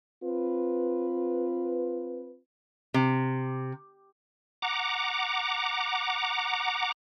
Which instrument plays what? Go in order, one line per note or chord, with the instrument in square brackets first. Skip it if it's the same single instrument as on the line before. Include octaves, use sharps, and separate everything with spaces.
[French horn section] C4 F4 B4
[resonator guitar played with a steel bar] C3
[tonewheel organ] F#5 A#5 D6